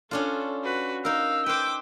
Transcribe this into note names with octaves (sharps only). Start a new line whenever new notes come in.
C#4 D4 F4 A4
F#4 B4
D#4 A#4 F5 E6
B4 C5 G5 D6